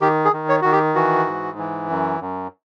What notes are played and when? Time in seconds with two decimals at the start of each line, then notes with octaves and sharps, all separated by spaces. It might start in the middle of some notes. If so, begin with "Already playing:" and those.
0.01 D#3 G4
0.25 G#4
0.33 D#3
0.49 C#5
0.61 D#3 F#4
0.72 G4
0.95 E3 F#4
1.26 G#2
1.58 E3
1.89 F#2
2.20 F#2